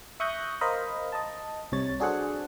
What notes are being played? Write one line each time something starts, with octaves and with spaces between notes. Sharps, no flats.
E5 C#6 D#6 F#6 G6 A#6
A#4 C5 D#5 F5 B5
D#5 A5
C2 C3 C#5 A6
D4 F#4 G#4 A4 C5 F#5